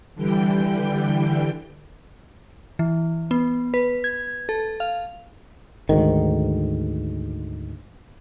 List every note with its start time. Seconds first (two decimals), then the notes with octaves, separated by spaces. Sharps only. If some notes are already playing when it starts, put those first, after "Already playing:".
0.15 D3 E3 G3 G5
2.79 E3
3.31 B3
3.74 B4
4.04 G#6
4.49 A4
4.80 F5
5.89 D2 G#2 D#3